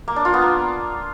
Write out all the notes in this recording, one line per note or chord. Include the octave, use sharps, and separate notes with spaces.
A#3
D4
F4
B3
A#3